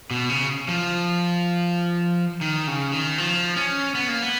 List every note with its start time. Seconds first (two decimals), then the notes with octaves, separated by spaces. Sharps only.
0.11 B2
0.29 C#3
0.68 F3
2.41 D#3
2.67 C#3
2.92 D#3
3.18 F3
3.56 C#4
3.95 B3
4.09 A#3
4.22 B3